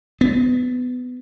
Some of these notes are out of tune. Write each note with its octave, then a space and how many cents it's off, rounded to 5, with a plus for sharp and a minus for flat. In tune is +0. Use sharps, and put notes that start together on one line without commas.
B3 +20